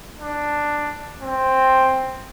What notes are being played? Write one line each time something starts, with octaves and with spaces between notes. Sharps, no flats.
D4
C4